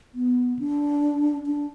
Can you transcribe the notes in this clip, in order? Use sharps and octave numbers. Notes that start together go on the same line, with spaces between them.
B3
D4
D4